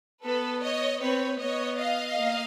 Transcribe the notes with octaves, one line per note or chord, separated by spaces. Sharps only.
B3 A4 B4
C#5 D#5
C4 B4 C#5
B3 C#5 D#5
D#5 F5
A#3